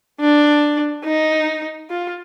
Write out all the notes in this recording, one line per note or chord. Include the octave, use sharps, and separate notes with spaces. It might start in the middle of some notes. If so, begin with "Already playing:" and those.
D4
D#4
F4